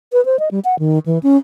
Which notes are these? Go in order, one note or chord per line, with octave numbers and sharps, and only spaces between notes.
B4
C5
D#5
G3
F#5
D#3
E3
C#4